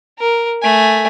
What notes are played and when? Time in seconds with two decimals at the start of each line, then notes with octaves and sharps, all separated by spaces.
0.19 A#4
0.63 A3 G#5